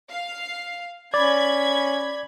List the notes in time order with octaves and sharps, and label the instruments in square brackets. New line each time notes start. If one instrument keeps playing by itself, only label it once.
[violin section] F5
[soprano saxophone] C#4 [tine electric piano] D5 [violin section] B5 G#6